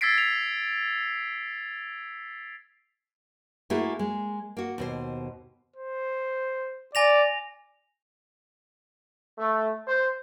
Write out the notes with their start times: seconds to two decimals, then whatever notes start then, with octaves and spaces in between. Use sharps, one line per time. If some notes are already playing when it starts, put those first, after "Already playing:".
0.01 E6 G#6 A6 B6 C7 D7
0.18 F7
3.70 A3 A#3 E4 F#4 G#4
3.99 G#3
4.57 A#3 F#4
4.78 D#2 B2 C5
5.76 C5
6.95 D5 G#5 A#6 F7
9.39 A3
9.88 C5